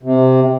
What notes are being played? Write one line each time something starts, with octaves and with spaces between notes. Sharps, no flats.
C3